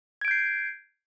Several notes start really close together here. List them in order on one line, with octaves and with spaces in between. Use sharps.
G#6 D7 G6 C7